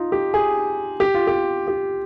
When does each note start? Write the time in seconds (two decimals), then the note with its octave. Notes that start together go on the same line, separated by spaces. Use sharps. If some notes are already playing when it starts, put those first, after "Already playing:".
Already playing: D#4 F4
0.12 G4
0.34 G#4
1.00 G4
1.14 F4
1.27 G4
1.68 G4